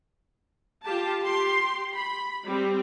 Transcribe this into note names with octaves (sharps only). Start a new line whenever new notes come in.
F4 G4 A5
G4 C6
B5
G3 C4